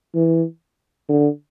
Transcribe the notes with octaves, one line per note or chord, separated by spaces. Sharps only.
E3
D3